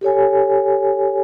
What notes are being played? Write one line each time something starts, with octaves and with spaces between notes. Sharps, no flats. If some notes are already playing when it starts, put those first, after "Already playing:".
G4 A4 C#5 G#5